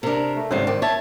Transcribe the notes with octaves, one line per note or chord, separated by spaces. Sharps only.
C3 D4 A#4
A3
G#1 C#3 G3 C5 C7
D#3 C4 D5
C#5 E5 A5